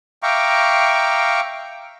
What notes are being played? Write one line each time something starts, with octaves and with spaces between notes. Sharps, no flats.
E5 F5 G5 A#5 C#6 D6